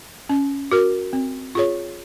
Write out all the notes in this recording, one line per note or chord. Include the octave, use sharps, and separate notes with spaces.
C#4
F#4 A#4
C4
F4 G#4 C#5